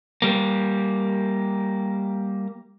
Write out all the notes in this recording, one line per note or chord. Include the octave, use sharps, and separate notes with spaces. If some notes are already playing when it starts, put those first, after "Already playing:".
G3 A#3